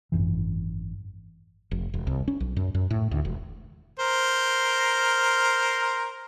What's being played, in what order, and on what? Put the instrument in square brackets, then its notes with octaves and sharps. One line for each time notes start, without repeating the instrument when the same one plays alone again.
[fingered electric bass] G#1 C#2 F#2 E3
[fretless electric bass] F1
E1
C2
C#4
B1
F#2
F#2
A2
D2
E1
[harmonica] A#4 C5